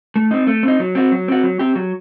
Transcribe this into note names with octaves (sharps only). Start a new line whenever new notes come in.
A3
C4 D#4
A3
C4 D#4
F#3
C4 F#4
F#3
C4 F#4
F#3
C4 G4
F#3